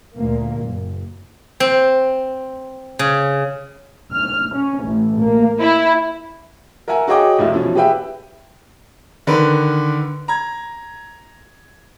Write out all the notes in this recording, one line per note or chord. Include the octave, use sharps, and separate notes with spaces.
D2 A#2 A#3
F#1
C4
C#3
F6
C#4
A1
A#3
E4
A#4 E5 F#5 G#5 A#5
F#4 G#4 C#5 D#5 G5 D6
F1 C2 E4
B2 E3 F3 C#4
G4 G#4 B4 E5 G5
D3 D#3 A#4 B4
A#5 G#6